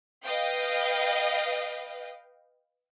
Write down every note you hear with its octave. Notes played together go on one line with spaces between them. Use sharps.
B4 D#5 F5 G5